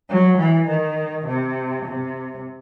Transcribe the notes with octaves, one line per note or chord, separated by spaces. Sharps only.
F#3
E3
D#3
C3
C3